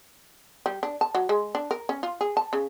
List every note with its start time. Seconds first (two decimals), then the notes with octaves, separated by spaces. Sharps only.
0.66 G3
0.83 D4
1.01 A5
1.15 F#3
1.29 G#3
1.55 D4
1.71 A#4
1.89 C#4
2.03 F4
2.21 G#4
2.37 A5
2.53 C#3